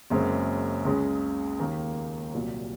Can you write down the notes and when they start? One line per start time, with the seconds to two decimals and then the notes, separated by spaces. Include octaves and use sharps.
0.10 F#1 F#2 C#3 G#3 C4
0.85 C#2 C#3 G#3 C#4
1.59 D#2 D#3 A#3
2.34 C2 A#2 F#3